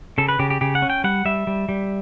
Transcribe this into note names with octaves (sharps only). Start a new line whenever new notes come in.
C#3 A4
B4
C#3 G4
G4
C#3 G4
F#5
C#4
G5
G3 F#5
G3 E5
G3
G3